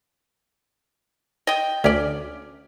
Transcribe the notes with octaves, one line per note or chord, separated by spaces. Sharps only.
D#5 G5
D2 C#4 D5